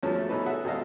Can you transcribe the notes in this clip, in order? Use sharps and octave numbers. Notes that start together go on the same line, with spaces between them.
E2 F3 F#3 A3 B3 C#4
A3
B2 E3 C#4 D#4 A4 B4
G#4 A4 E5 F#5
G#1 E2 B2 A4 D#5 F5